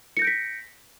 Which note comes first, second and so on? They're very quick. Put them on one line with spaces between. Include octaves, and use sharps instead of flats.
C#7 A#6 G6 D7 B6